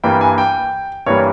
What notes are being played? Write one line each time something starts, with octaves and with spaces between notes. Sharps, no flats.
G2 E3 G3 A#3 G5
G#5
G5
G2 E3 G3 A#3 C#5